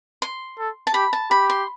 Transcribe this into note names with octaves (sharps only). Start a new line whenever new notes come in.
C6
A4
A5
G4 B5
A5
G4 B5
C6